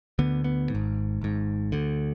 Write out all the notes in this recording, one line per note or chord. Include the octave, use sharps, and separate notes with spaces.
D2 D3 B3
B3
G#1 G#2
G#1 G#2
D2 D3